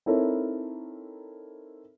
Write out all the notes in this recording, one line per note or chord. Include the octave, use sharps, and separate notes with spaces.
C4 D#4 E4 A4 A#4 C#5